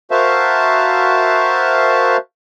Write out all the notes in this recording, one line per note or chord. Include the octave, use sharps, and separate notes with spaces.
F#4 A#4 C5 E5 F5 A5